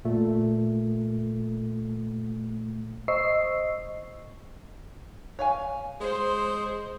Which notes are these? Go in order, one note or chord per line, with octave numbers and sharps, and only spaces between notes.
A#2 A3
C5 D#5 C#6 E6 C7
C#5 F5 G#5
G#3 C5